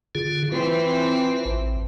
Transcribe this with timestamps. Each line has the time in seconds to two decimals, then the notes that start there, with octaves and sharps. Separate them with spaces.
0.15 D3 F4 G#4
0.52 E3 C4 F4 B4
1.45 A1